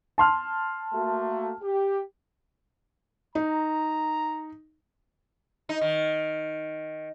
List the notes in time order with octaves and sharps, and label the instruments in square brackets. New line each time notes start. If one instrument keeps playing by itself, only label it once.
[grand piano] A5 C6 F6
[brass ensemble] A3 A#3 F#4
G4
[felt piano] D#4 [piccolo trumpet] A#5
[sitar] D#4
D#3